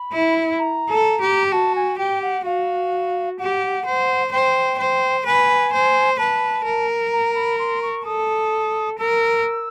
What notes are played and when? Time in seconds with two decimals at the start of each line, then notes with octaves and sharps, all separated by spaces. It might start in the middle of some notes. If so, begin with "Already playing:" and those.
Already playing: B5
0.12 E4
0.59 A#5
0.89 A4
1.21 G4
1.52 F#4 A5
1.76 G#5
1.98 G4 G5
2.22 F#5
2.45 F#4 F5
3.39 G4 F#5
3.86 C5
4.32 C5 G5
4.79 C5
5.26 B4 G#5
5.73 C5
6.19 B4 A5
6.65 A#4
7.13 A#5
7.35 B5
7.59 C6
7.82 C#6
8.05 A4 D#6
8.99 A#4 E6